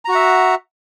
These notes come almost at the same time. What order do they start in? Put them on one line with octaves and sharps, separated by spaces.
A#5 F#4 F#5 E5